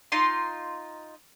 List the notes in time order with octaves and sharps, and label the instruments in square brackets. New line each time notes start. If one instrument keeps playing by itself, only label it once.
[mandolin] D#4 F4 C6